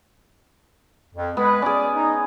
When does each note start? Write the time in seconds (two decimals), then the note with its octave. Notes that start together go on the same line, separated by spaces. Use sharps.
1.15 F2
1.37 G#3 B3 B4
1.62 C#4 G#4 D5
1.96 D#4